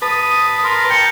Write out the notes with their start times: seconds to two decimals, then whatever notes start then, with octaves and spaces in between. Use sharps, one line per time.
0.02 B4 A5 D#6
0.64 A#4 C6
0.90 G5 A5 C#7